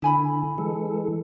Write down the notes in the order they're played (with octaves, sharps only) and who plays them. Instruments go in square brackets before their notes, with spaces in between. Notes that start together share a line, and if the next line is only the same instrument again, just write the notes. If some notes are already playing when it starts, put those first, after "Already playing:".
[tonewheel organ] D3 [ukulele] E4 G#5 B5
[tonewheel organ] E3 G#3 A4